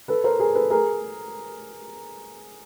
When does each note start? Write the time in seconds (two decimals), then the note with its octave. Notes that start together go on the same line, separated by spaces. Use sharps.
0.08 A4 B4
0.24 A#4 C5
0.39 G#4 A#4
0.55 A4 B4
0.70 G#4 A#4